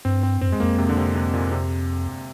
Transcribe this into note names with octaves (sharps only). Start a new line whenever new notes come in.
G2 C4
C4
G2 C4
F2
G#3
F2 A#3
C3
D3
C3
C3
A#2
C3